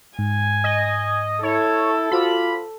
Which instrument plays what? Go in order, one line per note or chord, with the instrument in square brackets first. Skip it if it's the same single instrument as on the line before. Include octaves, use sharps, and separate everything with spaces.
[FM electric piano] G#2 [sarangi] G#5
[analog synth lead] D#5
[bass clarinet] E4 [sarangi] A4 [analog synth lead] C#5
[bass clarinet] F4 [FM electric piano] F#4 C5 D6 [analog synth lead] B5